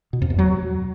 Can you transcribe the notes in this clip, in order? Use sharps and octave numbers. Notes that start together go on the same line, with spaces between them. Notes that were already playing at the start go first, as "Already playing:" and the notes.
B2
F2
E2
F#3